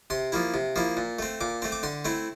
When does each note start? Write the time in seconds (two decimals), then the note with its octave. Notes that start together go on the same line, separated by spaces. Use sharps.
0.10 C3 C6
0.32 F3 A#3 E4
0.54 C3
0.76 F3 A#3 E4
0.97 A#2
1.19 A3 C4
1.41 A#2 D6
1.62 A3 C4
1.72 D6
1.83 D3 C6
2.05 A3 C4 E4